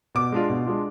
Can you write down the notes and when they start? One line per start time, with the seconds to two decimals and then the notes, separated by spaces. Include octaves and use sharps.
0.15 B2 D6
0.32 G#3 D4 F4
0.49 B2
0.67 G#3 D4 F4